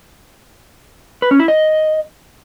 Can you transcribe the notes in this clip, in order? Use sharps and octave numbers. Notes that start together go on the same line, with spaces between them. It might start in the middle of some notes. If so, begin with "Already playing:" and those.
B4
C#4
E4
D#5